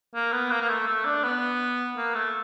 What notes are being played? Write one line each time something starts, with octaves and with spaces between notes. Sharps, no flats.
A#3
B3
A#3
A#3
A3
A3
D4
B3
A#3
A3